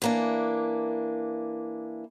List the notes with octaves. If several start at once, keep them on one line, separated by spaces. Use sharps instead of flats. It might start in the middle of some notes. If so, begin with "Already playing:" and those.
E3 A#3 D4